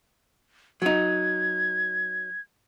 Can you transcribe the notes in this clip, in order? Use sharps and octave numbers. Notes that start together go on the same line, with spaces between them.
F#3 D#4 G#6